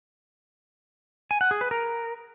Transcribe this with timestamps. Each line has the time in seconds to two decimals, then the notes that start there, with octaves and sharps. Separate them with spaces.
1.31 G#5
1.41 F#5
1.51 G#4
1.61 B4
1.71 A#4